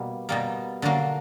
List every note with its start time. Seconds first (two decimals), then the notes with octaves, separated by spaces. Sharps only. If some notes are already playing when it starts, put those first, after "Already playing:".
Already playing: B2 G3 A#3
0.29 B2 G3 A#3
0.82 D3 F#3 A#3 D4